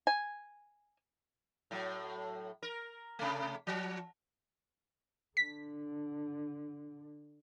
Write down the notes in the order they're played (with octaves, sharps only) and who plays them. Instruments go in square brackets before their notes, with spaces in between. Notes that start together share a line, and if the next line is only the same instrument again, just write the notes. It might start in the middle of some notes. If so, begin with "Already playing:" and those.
[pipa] G#5
[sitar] A2 F#3
A#4
C3 A3
F3
[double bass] D3 [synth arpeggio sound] B6